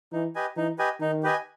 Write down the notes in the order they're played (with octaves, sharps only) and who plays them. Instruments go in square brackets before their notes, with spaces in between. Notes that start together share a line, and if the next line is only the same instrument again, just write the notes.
[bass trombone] E3 [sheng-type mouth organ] D#4
[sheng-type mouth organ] G4 B4 D#5 G#5
[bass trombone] E3 [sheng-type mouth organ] D#4
[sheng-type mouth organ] G4 B4 D#5 G#5
[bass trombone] D#3 [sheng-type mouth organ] D#4
[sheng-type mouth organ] G4 B4 D#5 G#5